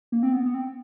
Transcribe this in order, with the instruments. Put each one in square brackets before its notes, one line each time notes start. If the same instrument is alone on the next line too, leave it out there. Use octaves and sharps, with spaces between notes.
[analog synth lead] A#3
C4
B3
B3
C4